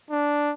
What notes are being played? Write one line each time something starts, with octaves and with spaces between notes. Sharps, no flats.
D4